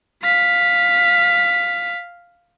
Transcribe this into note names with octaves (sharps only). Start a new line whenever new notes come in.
F5 B6